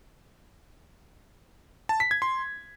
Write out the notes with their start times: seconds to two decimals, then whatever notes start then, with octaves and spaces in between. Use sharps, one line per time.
1.89 A5
2.00 B6
2.11 G#6
2.22 C6